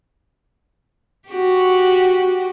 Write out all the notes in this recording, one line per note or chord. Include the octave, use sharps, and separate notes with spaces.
F#4 G4